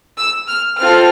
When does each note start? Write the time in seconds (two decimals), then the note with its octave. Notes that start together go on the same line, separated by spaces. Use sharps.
0.17 E6
0.47 F6
0.78 C4 F4 A4 F6